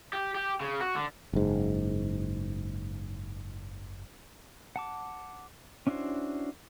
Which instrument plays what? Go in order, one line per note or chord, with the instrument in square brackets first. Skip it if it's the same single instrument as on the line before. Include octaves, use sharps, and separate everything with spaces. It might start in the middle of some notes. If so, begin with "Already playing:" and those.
[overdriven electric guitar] G4
G4
C#3
F#4
D3
[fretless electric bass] F#1 G#2
[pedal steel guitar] F#5 A5 D6
C#4 D4 E4 F#4 C5